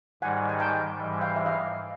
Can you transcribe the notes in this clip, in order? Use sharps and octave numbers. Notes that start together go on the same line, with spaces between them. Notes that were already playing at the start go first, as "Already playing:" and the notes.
G#2 D#3 G3 F#5 G#5
G#5
G5 A5
G#2 E3 G3
F5 G5
E5
D#5 F5